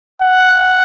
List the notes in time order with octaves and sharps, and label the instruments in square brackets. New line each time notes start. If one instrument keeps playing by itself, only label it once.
[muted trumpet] F#5